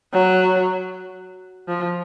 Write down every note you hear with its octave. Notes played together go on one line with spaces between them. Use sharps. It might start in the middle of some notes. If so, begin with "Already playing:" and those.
F#3
F3